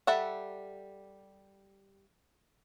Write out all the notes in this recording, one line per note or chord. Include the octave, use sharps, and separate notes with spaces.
G3 A4 E5 F#5